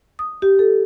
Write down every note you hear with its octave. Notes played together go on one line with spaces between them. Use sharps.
D#6
G4
A4